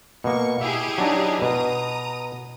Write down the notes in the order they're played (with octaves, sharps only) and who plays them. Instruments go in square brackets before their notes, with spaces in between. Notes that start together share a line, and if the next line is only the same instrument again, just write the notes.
[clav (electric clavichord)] B2 A#3 [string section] C#6
[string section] E4 G4 G#4 [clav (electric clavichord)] E5
[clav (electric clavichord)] F#3 D4 D#4
[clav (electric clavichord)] B2 [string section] A#5 D#6